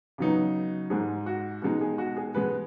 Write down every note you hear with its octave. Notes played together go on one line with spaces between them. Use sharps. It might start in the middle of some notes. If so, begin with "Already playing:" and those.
C#3 F#3 B3 D#4
G#2 G#3 D#4 G#4
F#4
B2 G#3 D#4 F#4
G#4
F#4
G#4
B2 G#3 B3 B4